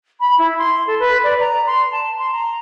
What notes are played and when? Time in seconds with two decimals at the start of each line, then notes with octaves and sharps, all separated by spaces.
0.20 B5
0.38 E4
0.58 C6
0.86 A4
0.99 B4
1.23 D5
1.40 A#5
1.66 C6
1.91 A5
2.19 C6
2.32 A#5